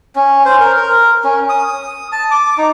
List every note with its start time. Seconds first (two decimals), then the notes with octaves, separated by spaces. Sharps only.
0.16 C#4
0.45 C5
0.60 A#4
0.77 A#4
1.24 C#4
1.49 D#6
2.12 A5
2.31 D6
2.58 D#4